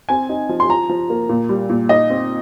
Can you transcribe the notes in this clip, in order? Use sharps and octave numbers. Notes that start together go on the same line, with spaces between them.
C4 G#5
D#4
F3
C6
F3 A#5
F3
A#3
A#2
G3
A#2
D#4 D#5
C4